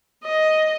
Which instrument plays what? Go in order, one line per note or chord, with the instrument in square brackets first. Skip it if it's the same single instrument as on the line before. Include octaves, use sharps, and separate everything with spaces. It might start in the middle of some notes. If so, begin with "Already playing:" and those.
[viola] D#5